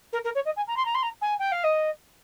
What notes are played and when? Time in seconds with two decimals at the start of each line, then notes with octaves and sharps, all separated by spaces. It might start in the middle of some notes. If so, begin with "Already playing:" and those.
0.13 A#4
0.24 A#4
0.35 C#5
0.45 D#5
0.57 G#5
0.68 A#5
0.77 C6
0.85 A#5
0.95 C6
1.03 A#5
1.22 G#5
1.39 G5
1.52 F5
1.64 D#5